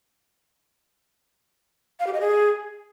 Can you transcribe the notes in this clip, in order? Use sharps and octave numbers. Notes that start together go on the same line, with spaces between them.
F5
G4
D#5
G#4